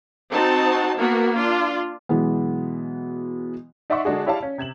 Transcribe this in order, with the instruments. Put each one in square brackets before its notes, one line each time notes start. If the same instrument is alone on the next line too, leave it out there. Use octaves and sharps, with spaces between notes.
[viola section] C4 D#4 F#4 A5
A#3 B3 F#4
D4 F4
[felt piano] B2 E3 F#3 G#3 B3
[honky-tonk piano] D#4 D5 E5 F#5 C6 C#6
D3 G#3 D4 F#4 G#4
E4 G4 C#5 D5 F5 A5
C#4
C3 G#6 E7 F#7